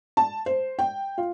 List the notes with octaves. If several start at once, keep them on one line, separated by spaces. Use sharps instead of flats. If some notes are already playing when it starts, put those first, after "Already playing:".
A5
C5
G5
F4